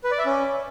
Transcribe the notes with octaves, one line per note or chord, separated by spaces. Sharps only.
B4
D5
E5
C#4